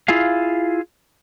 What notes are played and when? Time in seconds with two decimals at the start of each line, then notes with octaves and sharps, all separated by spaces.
0.08 E4 F4 G#4 F5